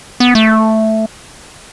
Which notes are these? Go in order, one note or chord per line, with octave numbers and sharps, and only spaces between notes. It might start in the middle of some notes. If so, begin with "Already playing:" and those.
B3
A3